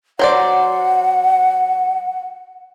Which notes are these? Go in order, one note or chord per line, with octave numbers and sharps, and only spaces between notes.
F#3 C5 D5 F#5